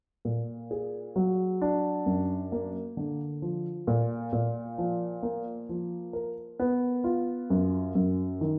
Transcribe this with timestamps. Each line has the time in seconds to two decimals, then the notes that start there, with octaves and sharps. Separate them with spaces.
0.25 A#2
0.71 G#4
1.16 F#3
1.61 D4
2.06 F#2
2.52 A#3
2.97 D3
3.42 F3
3.87 A#2
4.33 A#2
4.78 F3
5.23 A#3
5.69 F3
6.13 A#4
6.60 B3
7.04 F4
7.50 F#2
7.95 F#2
8.41 D#3